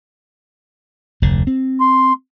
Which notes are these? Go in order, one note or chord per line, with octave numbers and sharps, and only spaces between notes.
F1 D2 D3
C4
C6